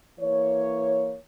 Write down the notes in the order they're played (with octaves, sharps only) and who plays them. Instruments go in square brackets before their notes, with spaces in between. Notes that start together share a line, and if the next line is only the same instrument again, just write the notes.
[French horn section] E3 A#3 C#5